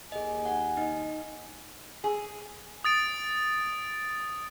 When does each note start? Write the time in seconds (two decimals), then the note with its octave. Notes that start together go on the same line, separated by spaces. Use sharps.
0.12 D#2 G#4 D#5 G#5
0.45 F#5
0.77 D#4 D#5
2.04 G#4
2.84 D#6 A6 D7